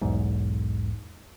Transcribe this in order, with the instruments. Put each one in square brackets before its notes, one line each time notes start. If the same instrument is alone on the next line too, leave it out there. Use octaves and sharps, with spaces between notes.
[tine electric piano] B1 E2 G#2